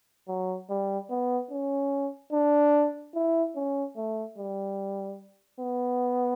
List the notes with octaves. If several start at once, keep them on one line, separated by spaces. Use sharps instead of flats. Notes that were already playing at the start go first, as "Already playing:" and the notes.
F#3
G3
B3
C#4
D4
E4
C#4
A3
G3
B3